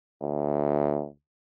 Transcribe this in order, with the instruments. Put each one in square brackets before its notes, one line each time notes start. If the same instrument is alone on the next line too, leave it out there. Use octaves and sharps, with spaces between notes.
[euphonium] D2